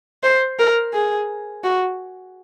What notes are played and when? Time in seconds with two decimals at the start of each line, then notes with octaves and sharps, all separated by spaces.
0.23 C5
0.59 A#4
0.93 G#4
1.64 F#4